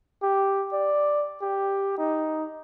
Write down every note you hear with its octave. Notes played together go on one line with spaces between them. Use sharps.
G4
D5
G4
D#4